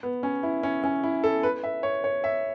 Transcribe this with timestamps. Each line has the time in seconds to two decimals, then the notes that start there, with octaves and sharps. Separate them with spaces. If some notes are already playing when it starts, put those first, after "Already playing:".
0.03 B3
0.23 C#4
0.43 E4
0.63 C#4
0.84 C#4
1.04 E4
1.24 A4
1.43 B4
1.64 E5
1.83 C#5
2.04 C#5
2.24 E5